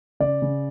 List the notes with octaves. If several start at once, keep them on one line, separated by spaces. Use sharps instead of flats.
C#3 D5
C#3